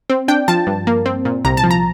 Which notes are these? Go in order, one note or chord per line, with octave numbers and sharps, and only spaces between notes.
C4
D4 G5
F3 A5
G2
A#3
C4
A#2
C2 A#5
A5
F3
A#5